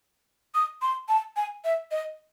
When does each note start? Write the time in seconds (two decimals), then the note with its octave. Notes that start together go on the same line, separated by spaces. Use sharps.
0.55 D#6
0.82 C6
1.09 A5
1.36 G#5
1.64 E5
1.91 D#5